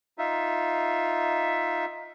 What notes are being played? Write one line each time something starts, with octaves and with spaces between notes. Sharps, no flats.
D#4 F4 E5